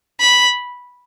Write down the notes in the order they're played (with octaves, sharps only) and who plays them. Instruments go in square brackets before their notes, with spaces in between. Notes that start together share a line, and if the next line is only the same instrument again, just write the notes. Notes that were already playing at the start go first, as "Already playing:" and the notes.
[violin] B5